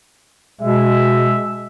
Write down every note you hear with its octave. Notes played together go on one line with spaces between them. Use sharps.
B2 G#3 E5